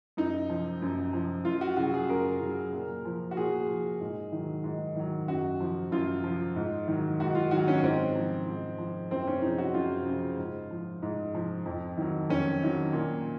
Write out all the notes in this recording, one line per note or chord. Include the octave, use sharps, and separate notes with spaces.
F#2 D#4
F3
F#2
F3
F#2 F4
F#4
C#3 F#3 F#4
G#4
F#2 A#4
C#3 F#3
A#2
F3
F#4
A#2 G#4
F3
G#2
D#3 F#3
G#2
D#3 F#3
F#2 F#4
F3
F#2 F4
F3
G#2
D#3 F#3
G#2 F#4
F4
D#3 F#3 F#4
C#4
G#2 C4
F3
G#2
F3
F#2 C4
C#4
C#3 F3 D#4
F#4
F#2 F4
C#3 F3
G#2
F3
G#2
F3
F2
D#3 F#3
F2 C#4
D#3 F#3
A#2